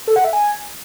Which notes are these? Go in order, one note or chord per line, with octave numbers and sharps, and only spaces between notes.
A4
F#5
E5
G#5